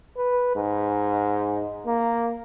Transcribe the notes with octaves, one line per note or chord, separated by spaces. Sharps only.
B4
G#2
A#3